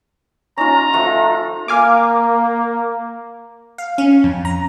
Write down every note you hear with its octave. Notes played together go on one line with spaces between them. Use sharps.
C#4 D#4 F4 A#5
F3 A3 F4
A#3 F5 G#5 D6
F5
C#4
F2
A#5